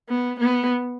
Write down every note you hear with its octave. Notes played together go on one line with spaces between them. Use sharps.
B3
B3